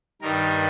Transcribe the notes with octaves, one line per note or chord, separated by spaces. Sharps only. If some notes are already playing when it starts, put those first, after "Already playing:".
G2 D#3 G3 A#4